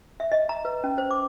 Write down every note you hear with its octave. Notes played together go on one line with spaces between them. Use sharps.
E5
D#5
A#5
B4
C#4
C5
D6